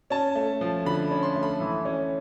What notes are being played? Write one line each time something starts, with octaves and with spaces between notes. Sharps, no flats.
C#4 A5
A3
F3
D3 B5
C#4
C6
A3
B5
E3
C#4